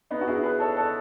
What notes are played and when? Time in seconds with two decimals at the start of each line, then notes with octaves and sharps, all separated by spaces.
0.11 B3 D#4
0.21 F#4
0.27 E4 G#4
0.43 G#4 B4
0.60 A4 C#5
0.77 A4 C#5